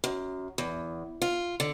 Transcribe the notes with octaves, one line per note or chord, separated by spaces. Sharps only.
F#2
E2
F4
D3